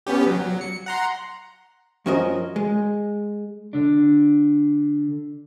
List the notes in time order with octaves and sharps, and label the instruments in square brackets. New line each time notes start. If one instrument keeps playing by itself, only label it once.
[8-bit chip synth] B3 C#4 G4
F#3
C#7
F#5 A#5 C6
[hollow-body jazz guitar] F#2 F3 C#4 F#4 A#4 D#5
G#3
[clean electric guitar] D3 D4